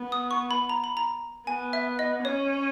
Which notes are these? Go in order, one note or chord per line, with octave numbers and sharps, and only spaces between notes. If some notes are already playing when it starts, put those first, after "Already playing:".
Already playing: B3
D#6
C#6
B5
A#5
B5
A#5
B3 G#5
E5
D#5
C#4 C#5